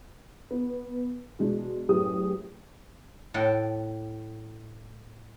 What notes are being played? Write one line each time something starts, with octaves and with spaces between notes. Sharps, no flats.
B3
B2 G#3 D4
F#2 A2 G4 G#4 B4 D#6
A2 A4 F#5 G5